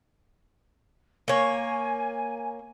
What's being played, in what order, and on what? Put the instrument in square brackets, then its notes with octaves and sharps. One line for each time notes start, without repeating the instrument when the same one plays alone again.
[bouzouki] A#3 C#5 [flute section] G#5